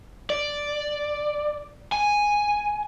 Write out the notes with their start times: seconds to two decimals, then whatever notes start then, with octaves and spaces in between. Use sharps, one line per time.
0.30 D5
1.92 G#5